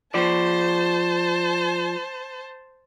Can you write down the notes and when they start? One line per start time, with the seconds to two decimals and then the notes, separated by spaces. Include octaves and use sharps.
0.14 F3 C5 D5 A5